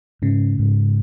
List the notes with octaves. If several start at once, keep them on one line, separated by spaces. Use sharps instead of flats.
G#2 C#3
G#2